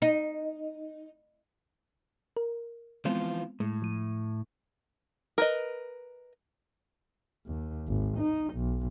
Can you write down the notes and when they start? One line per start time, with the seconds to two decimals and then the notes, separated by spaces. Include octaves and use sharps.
0.02 D#4
2.37 A#4
3.05 E3 F3 G#3 B3 C4 F4
3.60 A2 G#3
3.82 F3 D#7
5.38 A#4 B4 D#5
7.46 D#2
7.88 G#1
8.18 D#4
8.55 B1